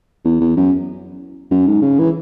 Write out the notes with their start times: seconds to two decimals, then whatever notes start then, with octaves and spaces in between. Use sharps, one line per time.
0.25 E2
0.40 E2
0.57 F#2
1.51 F#2
1.67 G#2
1.82 C#3
1.99 E3